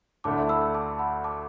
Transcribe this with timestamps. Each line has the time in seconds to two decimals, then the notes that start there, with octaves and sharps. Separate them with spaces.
0.24 D2 D3 A3 E4 A5 D6
0.49 B5 E6
0.74 A5 D6
0.99 F#5 B5
1.24 A5 D6